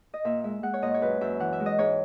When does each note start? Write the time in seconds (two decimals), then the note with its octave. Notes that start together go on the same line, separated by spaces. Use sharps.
0.14 D#5
0.25 A#2 E5
0.44 G#3 E5
0.63 G#3 F#5
0.74 C#5
0.82 A#2 D#5
0.94 C#5
1.01 F#2 B4
1.21 F#2 E5
1.40 E3 F#5
1.53 E5
1.60 G#3
1.66 D#5
1.78 G#2 C#5